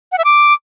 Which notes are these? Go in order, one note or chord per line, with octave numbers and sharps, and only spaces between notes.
F#5
E5
D6